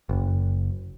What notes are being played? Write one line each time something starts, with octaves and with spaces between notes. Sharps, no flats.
F#1